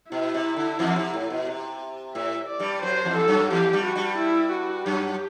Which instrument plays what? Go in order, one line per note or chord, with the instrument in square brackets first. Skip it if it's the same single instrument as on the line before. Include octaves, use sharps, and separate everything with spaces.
[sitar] B2 [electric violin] E4
[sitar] C3
D3
E2 E3
C3
A2
B2
C3
[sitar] A2 [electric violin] E5
[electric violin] D5
[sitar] G2 G3
[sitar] F#2 F#3 [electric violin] C5
[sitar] E2 E3
[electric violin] A4
[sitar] F#2 F#3
[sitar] E2 E3 [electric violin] G4
[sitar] G2 G3
[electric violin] F#4
[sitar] G2 G3
[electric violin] E4
F#4
[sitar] F#2 F#3 [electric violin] G4